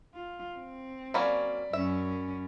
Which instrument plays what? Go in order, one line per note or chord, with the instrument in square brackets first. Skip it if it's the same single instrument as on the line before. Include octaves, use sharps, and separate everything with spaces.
[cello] F4
C4
[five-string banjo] F#3 A#3 C#4 [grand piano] D5 B5
[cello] F#2 C#4 [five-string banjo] E5